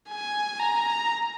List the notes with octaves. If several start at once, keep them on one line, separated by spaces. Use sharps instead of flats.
G#5
A#5